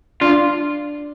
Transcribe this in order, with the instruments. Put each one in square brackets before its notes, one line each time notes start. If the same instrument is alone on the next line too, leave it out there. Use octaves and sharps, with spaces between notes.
[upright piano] D4 [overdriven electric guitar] F4